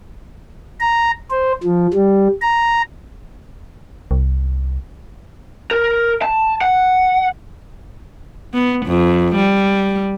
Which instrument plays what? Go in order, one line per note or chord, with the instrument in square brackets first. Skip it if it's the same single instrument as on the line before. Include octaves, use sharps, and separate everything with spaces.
[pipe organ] A#5
C5
F3
G3
A#5
[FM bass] C2
[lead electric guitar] A#4
A5
F#5
[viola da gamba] B3
F2
G3